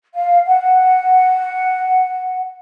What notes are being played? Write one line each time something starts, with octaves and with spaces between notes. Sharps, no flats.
F5
F#5